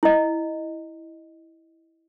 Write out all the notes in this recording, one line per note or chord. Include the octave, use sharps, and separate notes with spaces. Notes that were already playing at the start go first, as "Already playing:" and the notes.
E4 D#5